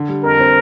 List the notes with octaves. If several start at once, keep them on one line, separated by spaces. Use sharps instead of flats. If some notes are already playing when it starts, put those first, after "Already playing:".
Already playing: D3
G3
F2 A#4
C4